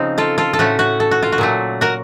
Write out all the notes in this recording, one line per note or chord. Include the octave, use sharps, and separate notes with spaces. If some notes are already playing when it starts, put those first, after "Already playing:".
Already playing: C#3 F3 C4 D#4
F4 A4
F4 A4
A4
A2 A3 C#4 F#4
F#4
A4
F#4
F4
F#4
A#2 F#3 A3
F#4 A#4